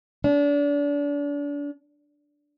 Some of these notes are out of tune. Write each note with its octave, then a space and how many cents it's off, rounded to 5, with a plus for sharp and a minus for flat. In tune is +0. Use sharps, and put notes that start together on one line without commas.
D4 -35